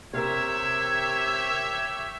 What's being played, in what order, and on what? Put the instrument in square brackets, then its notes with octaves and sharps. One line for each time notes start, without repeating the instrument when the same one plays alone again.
[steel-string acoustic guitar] C3 A#4 [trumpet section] G4 C#5 E5 [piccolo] G#6